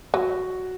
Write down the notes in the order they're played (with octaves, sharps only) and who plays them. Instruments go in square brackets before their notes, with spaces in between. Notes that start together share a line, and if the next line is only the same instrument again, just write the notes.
[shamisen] F#3 [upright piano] F#4